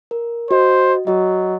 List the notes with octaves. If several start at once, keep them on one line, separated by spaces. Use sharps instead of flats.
A#4
F#4 C5 D#5
F#3 F#4 D#5